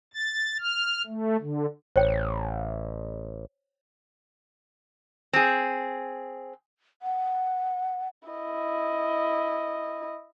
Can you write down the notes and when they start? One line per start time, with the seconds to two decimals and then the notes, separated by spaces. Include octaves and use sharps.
0.13 A6
0.60 F6
1.07 A3
1.40 D3
1.96 A1 C5 C#5 G5
5.33 C4 G#4
7.02 F#5
8.29 E4 D#5